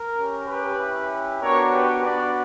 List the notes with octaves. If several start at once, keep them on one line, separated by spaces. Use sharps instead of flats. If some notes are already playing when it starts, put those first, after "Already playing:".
Already playing: A#4
C#4 G4
G4 B4
C#4 E4 G4
B3 D4 F#4 A#4 C#5
G4 B4
B3 D4 F#4 B4 D5